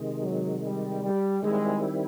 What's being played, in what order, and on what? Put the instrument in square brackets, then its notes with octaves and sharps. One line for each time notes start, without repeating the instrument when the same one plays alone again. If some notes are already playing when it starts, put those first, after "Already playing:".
Already playing: [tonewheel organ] C3 D#3 G#3
[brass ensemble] F#3
G3
G3
[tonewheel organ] D#3 G3 C4 E4 [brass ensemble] G#3